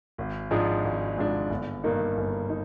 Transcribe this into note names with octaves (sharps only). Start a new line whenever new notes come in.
G#1
G#2 F3 G#3 D4
G#1
G#2 F3 G#3 D4
G1
G2 D#3 A#3 D#4
G1
D#4